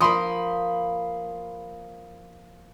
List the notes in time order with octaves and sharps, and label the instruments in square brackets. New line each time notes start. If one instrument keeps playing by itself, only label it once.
[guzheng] F3 A#3 [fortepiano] B5 C6 D#6